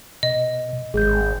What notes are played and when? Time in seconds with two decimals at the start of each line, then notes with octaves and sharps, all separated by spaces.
0.23 B2 D#5
0.94 G#1 G#3 G#4 G6